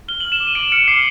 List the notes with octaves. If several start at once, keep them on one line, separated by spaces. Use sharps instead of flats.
F6 G7
F#7
F6
E7
D6
D#7
D6 D7
F6 C#7
D6 C7